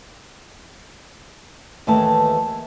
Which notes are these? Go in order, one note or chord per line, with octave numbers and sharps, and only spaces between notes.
D#2 E3 A3 B4 A5